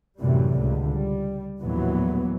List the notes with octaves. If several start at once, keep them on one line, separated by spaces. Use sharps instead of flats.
F#2 A2 C3 E3 G3
C#2 D3
G3
A#1 D#2 A2 E3 F#3 B3